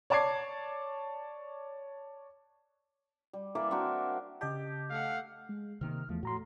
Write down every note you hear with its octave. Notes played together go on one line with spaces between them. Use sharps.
C#5 D5 A5 D6 G#6 C7
G3
E3 A#3 D5 E5
C4 D4 F#4 A#4
C#3 G4 D#5 A5
A3 F5 F#5
G#3
C3 D#3 A#3 F6
E2 F3 A3
A2 F#4 A#5 C6